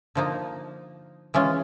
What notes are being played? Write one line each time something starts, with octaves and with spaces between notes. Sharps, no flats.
D3 F3 A#3 D#4
E3 G#3 C#4 F4